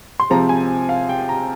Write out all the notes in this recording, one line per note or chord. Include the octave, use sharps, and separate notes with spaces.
C6
C3 F3 G#3 C4 A#5
G#5
F5
G5
A#5